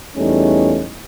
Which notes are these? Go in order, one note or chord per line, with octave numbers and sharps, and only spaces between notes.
E2 G3 A3 C#4 D#4